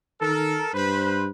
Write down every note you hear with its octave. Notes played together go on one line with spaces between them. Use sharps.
D#3 A4 A#4
G2 B4 C5